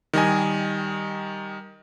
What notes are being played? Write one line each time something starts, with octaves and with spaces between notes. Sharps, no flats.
D#3 G3 D#5 G#5